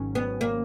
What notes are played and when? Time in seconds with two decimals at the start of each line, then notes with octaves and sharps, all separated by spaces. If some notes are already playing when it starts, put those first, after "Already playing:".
Already playing: G#1 G#2 D#3 F#3 C#4
0.15 B3
0.41 A#3